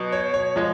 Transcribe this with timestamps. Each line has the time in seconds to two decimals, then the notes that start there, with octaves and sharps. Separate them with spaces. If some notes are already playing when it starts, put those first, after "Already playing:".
Already playing: B2 F#3
0.12 C#5
0.34 C#5
0.56 F3 G#3